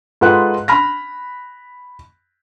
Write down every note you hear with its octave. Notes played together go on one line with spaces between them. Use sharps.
G#2 F4 A4 B4 F#5 F#6
B5 F6 A#6